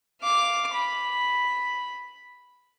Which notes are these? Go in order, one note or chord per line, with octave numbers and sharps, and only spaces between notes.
F5 D6
B5